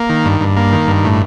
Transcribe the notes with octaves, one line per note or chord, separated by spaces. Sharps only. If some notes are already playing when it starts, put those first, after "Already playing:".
Already playing: A#3
D#3
G2
G2
A#3
D#3
G2
A2